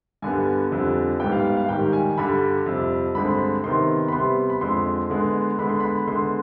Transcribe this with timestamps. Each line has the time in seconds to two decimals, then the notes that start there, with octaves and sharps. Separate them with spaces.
0.22 G2 D3 G3 B3 G#5
0.71 F2 D3 G3
1.20 G#2 G3 B3 G5
1.32 F5
1.45 F5
1.57 F5
1.69 G#2 D#3 G3 G5
1.93 G#5
2.18 G2 D3 G3 B5
2.66 F2 C3 G3
3.15 G2 D3 G#3 C4 B5
3.64 C3 D#3 B3 C6
4.08 B5
4.12 C3 G3 B3 C6
4.50 B5
4.61 F2 D3 G#3 C6
5.10 D3 G#3 B3
5.59 D3 G#3 B3 B5
5.69 C6
5.80 B5
6.07 D3 G#3 B3 C6